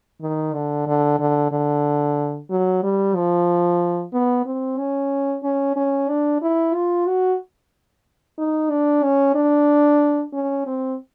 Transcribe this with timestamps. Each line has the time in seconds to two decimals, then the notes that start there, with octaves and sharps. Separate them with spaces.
0.21 D#3
0.54 D3
0.87 D3
1.19 D3
1.52 D3
2.50 F#3
2.83 G3
3.16 F3
4.13 B3
4.46 C4
4.78 C#4
5.44 C#4
5.76 C#4
6.09 D4
6.42 E4
6.74 F4
7.07 F#4
8.38 D#4
8.70 D4
9.03 C#4
9.35 D4
10.33 C#4
10.66 C4